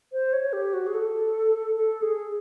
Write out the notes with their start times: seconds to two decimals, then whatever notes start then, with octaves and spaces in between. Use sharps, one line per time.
0.13 C5
0.33 C#5
0.53 G4
0.73 F#4
0.87 G#4
0.94 A4
1.75 A4
2.02 G#4